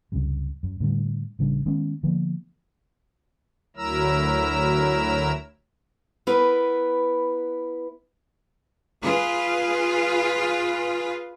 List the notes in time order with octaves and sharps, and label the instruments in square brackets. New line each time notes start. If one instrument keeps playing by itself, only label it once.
[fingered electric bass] C#2 F#2 C3 G3
F#2
A2 D3 F3 G3
A1 C#3 G3 D4
D#3 G#3 B3 C#4
D3 F3 A#3 B3
[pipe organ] D2 F#3 E4 A#4 A#5 E6
[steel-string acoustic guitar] B3 E4 A#4 B4
[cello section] F4 G#4 B4